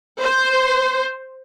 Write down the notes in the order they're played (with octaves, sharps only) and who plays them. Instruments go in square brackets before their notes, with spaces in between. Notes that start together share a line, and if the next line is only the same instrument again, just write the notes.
[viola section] C5